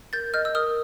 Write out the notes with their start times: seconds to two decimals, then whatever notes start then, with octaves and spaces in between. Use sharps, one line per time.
0.13 A#4 G6 A6
0.34 D#5 F6 G6
0.45 E6
0.55 A#4 D#6 F6